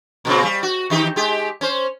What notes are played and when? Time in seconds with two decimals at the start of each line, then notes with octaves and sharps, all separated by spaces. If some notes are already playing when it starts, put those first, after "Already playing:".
0.25 A#2 C#3 C4
0.43 G3
0.63 F#4
0.90 D#3 D#4 G4
1.16 G#3 G4
1.61 C#4 C5